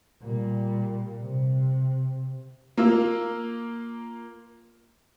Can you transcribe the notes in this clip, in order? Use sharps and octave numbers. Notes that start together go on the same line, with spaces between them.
A#2 G3
C3
A#3 F4 E6